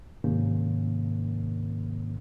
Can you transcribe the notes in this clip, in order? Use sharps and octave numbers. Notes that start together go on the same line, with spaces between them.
G#2 C3 D#3 A#3 C#4